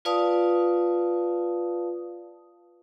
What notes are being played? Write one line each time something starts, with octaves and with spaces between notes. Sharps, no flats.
F4 B4 D5 F5 A5 D#6